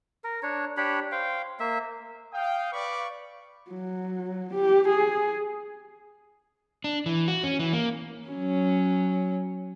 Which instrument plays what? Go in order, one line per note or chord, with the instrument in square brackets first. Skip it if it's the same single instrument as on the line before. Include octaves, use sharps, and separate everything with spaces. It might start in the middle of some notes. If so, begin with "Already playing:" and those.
[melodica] A#4
D4 C#5
D4 G4 C#5 B5
C5 F5 G5
A#3 E5
[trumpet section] F5 G5 D#6
B4 D5 F5 B5 C#6 D6
[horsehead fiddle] F#3
G4
G#4
[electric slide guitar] D4
E3
F#4
C#4
E3
A#3
[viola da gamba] F#3 C#4